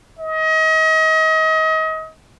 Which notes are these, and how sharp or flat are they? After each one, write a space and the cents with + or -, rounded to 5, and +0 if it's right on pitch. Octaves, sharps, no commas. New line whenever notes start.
D#5 +35